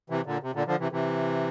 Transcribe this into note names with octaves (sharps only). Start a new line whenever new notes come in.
C3 E3
A#2 D3
C3
A#2 D3
D3 F3
C3 E3
C3 E3